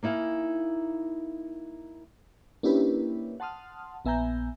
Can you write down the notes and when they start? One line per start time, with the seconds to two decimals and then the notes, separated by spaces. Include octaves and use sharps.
0.03 A#3 D#4 E4 F5 G#5
2.63 A#3 C#4 D4 E4 G4 B4
3.40 F#5 A5 C6 D#6 F6
4.05 A#1 B3 E5 G#5 A#5 G6